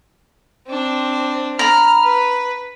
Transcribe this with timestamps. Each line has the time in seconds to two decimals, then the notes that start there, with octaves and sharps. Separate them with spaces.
0.67 C4 D4
1.59 A#5 B5 F6
2.04 B4